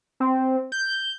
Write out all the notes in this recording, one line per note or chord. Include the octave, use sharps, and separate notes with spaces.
C4
G6